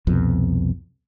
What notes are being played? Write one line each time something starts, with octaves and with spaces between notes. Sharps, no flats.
C2 F2 B2